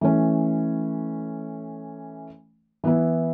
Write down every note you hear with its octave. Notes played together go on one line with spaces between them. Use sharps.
E3 A3 C#4
E3 B3 E4